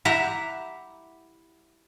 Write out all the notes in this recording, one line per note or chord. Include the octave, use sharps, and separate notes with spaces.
E4 G4 E5 F#5 A#5 B5